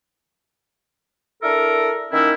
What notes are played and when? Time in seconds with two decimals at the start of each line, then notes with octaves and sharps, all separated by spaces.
1.42 D4 E4 A4 A#4
2.12 D#3 A#3 C#4 D#4 E4